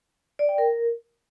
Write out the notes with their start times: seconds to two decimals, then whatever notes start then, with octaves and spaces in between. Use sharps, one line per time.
0.39 D5
0.49 G5
0.58 A#4